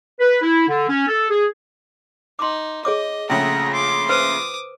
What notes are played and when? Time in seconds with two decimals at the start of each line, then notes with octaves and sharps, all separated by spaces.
0.20 B4
0.42 E4
0.68 D3
0.89 C#4
1.08 A4
1.30 G#4
2.39 D#4 C6 D6
2.85 G#4 C#5 D#5 D6
3.30 A#1 C#3 A3 F#5 G5 A#5
3.73 C6 D6
4.09 B4 C5 D6 D#6